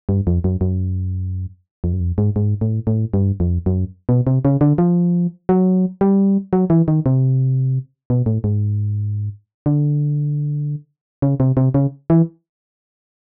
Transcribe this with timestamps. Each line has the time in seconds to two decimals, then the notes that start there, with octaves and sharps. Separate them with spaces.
0.09 G2
0.27 F2
0.44 F#2
0.61 F#2
1.84 F2
1.93 F#2
2.00 F2
2.18 G#2
2.36 G#2
2.61 A2
2.87 A2
3.14 G2
3.40 F2
3.66 F#2
4.09 B2
4.27 C3
4.45 C#3
4.61 D3
4.78 F3
5.49 F#3
6.01 G3
6.53 F#3
6.70 E3
6.88 D#3
7.06 C3
8.10 B2
8.26 A2
8.44 G#2
9.66 D3
11.22 C#3
11.40 C3
11.57 C3
11.74 C#3
12.10 E3